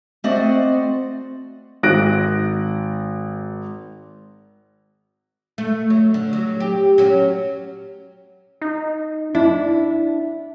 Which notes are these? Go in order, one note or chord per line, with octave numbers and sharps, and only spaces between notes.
A3 C4 F#4 C5 D5 D#5
G#1 F#6 A#6 D7
A3
F#3
D3
F#3
G4
F#3 C#4
D#4
D4 E4